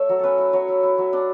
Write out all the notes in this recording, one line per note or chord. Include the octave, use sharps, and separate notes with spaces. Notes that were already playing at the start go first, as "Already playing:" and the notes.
Already playing: A3 C#5 E5
F#3
C#4 A4 B4
E4
F#3 C#5
E4
E4
F#3
D4 D5